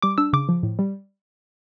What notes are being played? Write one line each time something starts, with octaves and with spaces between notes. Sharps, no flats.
G3 D6
D4 E6
C#3 D6
F3
A2
G3